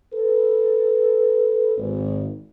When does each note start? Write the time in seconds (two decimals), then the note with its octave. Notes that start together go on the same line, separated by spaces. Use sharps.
0.13 A4 B4
1.77 G#1